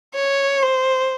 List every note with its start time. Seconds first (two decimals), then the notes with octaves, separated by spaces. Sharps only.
0.15 C#5
0.62 C5